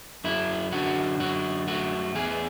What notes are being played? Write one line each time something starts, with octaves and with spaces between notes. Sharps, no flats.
F#2 E4
D3 F#4
F#2 F#4
A3 F#4
E2 G#4